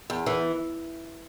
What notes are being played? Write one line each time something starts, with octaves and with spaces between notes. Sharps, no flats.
E2
E3